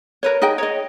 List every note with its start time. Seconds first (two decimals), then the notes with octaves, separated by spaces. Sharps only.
0.23 A#4 B4 C#5
0.42 D#4 G#4 D#5 G5
0.58 C#5 D#5